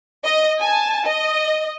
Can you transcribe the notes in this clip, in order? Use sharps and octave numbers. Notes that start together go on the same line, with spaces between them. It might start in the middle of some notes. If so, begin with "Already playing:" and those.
D#5
G#5 A5
D#5